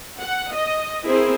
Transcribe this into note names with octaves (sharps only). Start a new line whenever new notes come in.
F#5
D#5
C4 E4 G#4 A#4 C5